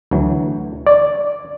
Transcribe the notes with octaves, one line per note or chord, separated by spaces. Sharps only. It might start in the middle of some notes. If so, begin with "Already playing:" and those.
D2 E3 F#3
C#5 D5